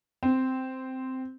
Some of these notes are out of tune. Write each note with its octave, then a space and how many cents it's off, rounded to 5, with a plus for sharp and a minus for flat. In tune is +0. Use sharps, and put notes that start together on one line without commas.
C4 -10